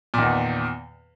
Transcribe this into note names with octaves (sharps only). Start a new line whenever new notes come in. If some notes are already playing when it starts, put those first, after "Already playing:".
E2 A#2 D#3